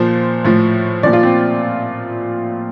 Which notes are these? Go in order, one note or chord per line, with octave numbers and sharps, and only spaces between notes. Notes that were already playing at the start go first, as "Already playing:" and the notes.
Already playing: A#2 F3 C5
A2 F3
A#2 F3 D5
F4
C4